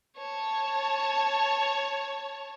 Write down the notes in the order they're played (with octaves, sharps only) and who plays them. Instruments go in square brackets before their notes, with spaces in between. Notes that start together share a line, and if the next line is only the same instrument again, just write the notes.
[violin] C#5 A5